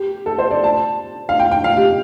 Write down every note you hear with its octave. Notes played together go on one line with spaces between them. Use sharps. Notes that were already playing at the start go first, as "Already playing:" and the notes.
Already playing: G4
A4
C5
D5
A5
F5
G5
G5
F5
G4